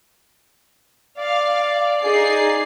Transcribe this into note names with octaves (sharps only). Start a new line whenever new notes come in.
D5 F5
D#4 G#4 D5 C7